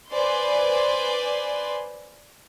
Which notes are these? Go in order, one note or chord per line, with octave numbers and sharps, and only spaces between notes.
B4 C5 D5 G#5 C6